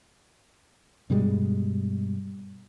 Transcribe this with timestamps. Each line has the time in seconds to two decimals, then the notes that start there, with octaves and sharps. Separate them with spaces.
1.10 G2 B2 G3 G#3